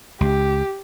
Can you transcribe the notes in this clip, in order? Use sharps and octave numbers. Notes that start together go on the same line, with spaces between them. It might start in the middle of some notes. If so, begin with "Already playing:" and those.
C#2 G4